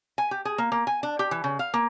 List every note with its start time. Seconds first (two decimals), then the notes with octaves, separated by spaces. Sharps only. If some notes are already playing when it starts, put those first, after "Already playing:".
0.18 G#5
0.31 G4
0.45 G#4
0.58 A#3
0.72 A#3
0.87 G#5
1.03 D4
1.19 G4
1.31 E3
1.44 C#3
1.59 F5
1.74 A#3